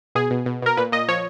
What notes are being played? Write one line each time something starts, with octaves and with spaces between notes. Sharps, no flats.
B2 G#4
B2
B2
B2 A#4
A#2 B4
A#2 D#5
F3 C#5